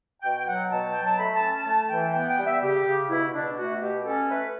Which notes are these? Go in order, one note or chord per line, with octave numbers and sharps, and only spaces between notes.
B2 G5
G5
F#3 F#5
B2 A5
F#3 G5
A5
A3 B5
A5
C#4
A5
A3 A5
E3 G5
B3 G5
G5
G3
E5
C#3 G4
C#3
B2 E4
B2 D4
A3 F#4
B2 G4
C#4 A4
A3 B4